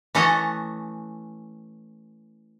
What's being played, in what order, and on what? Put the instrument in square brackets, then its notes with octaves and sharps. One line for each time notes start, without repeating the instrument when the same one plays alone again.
[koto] E3 A3 C#4 D#5 F#5 A5